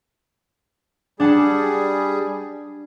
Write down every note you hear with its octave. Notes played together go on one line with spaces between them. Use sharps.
G3 D4 G#4 F#5 A5